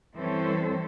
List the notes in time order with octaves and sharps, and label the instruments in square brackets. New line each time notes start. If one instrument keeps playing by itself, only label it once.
[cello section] E3 G3 C4 C#4 A4 C5